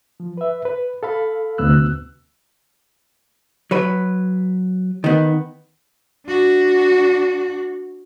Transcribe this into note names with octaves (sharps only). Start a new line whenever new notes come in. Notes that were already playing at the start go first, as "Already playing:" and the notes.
F3
B4 E5
B4
A4 F5 B5
D2 C3 B3 E6 F#6
F#3 B4
D#3 B3
D4 F#4